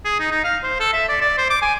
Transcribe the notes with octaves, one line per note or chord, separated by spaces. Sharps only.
G#4
D#4
D#4
F5
C5
A4
E5
D5
D5
C5
D6
G#5